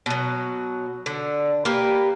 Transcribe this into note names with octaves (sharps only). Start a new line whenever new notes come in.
B2 F#3
D3
A#3 G4 A#4 B4